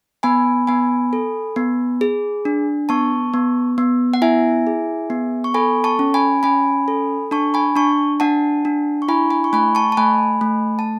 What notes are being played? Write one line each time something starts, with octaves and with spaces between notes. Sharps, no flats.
B3 G#5 B5
B3 G#5 B5
A4
B3
G#4
D4
B3 A5 C#6
B3
B3
F#5
E4 E5 G#5
G#4
B3
C#6
A4 G#5 B5
A5 C#6
C#4
G#5 B5
C#4 G#5 B5
A4
D4 A5 C#6
G#5 B5
D4 A5 C#6
D4 F#5 A5
D4
C#6
E4 G#5 B5
G#5 B5
C#6
A3 G#5 B5
A5 C#6
A5
A3 G#5 B5
A3
A5